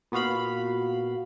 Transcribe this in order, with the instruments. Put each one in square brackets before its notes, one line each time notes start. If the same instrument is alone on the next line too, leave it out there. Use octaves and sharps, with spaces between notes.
[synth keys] A#2 B3 F#4 F5 B5